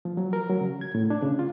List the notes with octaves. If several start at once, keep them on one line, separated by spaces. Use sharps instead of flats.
F3
F#3
A#4
F#3
C#3
G#6
A2
D4
C#3
F4